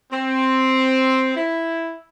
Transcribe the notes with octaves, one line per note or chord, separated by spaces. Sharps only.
C4
E4